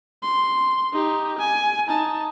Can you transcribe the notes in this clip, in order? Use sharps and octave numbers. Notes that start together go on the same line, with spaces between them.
C6
D#4 G4
G#5
D#4 A5